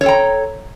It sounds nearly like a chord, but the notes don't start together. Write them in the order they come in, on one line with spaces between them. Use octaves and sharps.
C#5 A4 G5 A#5